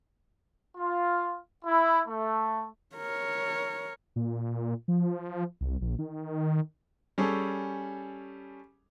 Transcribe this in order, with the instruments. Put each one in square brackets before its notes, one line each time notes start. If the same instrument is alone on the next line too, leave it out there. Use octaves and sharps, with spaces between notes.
[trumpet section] F4
E4
A3
[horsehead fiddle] A#4 C#5
[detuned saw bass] A#2
F3
C2
A#1
D#3
[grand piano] G3 C#4 G#4 A4